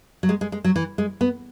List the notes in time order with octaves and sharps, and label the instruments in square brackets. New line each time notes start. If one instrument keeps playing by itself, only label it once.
[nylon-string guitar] F#3
G#3
G#3
G#3
F#3
E3
G#3
B3